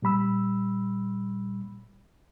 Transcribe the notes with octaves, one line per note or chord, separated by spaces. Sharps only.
A#2 G3 B5 E6